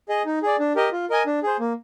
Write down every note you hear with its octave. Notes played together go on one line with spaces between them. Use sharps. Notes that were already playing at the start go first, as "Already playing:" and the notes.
G#4 D#5
D#4
G#4 D5
D4
G4 A#4 D#5
F4
A#4 D#5 G#5
D4
G#4 C5
A#3